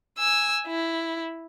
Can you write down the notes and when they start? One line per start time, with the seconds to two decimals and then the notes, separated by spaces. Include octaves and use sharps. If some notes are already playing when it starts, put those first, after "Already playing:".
0.19 G#5 E6
0.67 E4